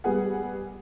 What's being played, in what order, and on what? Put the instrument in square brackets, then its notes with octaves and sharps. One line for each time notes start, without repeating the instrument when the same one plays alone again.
[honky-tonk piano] G3 B3 G#4 F#5